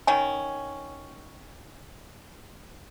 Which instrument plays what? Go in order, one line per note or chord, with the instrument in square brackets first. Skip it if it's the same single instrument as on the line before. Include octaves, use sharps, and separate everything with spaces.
[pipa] D#3 C#4 [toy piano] G#5